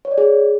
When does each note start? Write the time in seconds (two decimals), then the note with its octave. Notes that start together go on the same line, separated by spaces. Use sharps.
0.05 C#5
0.11 D5
0.18 G#4